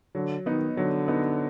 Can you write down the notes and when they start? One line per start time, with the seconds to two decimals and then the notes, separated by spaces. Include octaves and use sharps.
0.15 D3 F#3
0.46 D#3 B3 D#4
0.77 D3 F#3
1.08 B3 D#4